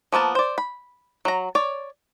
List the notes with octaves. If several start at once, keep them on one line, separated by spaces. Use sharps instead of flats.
F3 A#3 B3 A5
C5 D5
B5
F#3 A#5
C#5 D5